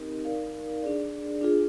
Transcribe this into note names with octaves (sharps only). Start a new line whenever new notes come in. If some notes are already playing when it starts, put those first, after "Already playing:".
Already playing: C4 D#4 G4 A#4 D#5
D#4 A#4 D5 F5
D4 G#4 D5
D4 F4 G#4